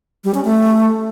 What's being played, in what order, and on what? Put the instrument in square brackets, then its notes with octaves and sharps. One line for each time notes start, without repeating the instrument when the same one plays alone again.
[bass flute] G3
C#4
A3